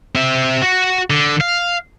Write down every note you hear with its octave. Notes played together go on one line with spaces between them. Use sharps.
C4 E5
F#4
D3
F5